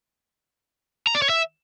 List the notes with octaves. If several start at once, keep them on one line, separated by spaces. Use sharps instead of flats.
A#5
D5
C#5
E5